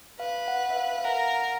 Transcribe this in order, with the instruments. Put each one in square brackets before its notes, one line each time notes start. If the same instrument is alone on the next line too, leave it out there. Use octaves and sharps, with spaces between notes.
[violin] B4 [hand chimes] F5
[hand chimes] F#5
E5
F5
F5
[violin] A#4 [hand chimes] F#5